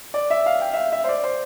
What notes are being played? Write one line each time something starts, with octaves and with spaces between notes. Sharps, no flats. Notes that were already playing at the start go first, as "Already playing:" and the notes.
D5
E5
F5
G5
E5
F5
E5
C5
D5
C5